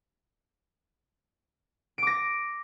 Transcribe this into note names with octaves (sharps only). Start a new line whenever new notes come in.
D6 A#6 D7